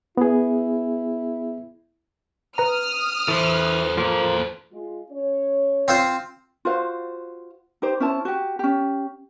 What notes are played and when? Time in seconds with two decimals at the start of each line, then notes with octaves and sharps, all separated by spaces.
0.17 B3 E4 G#4
2.58 B4 A#5 D#6 F6
3.28 E3 A4 C5
3.97 F3 A#3 A4 A#4 C5
4.73 G#3 F4
5.10 C#4 C#5
5.88 C4 F4 C5
6.65 F4 F#4 C5 F5
7.82 D#4 G4 C5
8.00 C#4 E4 C5 A5
8.25 F#4 G4
8.59 C#4 G4